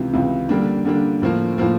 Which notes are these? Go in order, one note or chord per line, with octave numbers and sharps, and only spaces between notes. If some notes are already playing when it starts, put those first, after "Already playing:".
Already playing: C#2 C3 E3
C#2 C3 E3
D3 G3 A#3 D4
D3 G3 A#3 D4
A2 F3 A#3
A2 F3 A#3